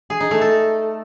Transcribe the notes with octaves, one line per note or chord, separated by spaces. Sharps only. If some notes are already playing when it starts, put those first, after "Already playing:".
G#4
D#4
A3
A4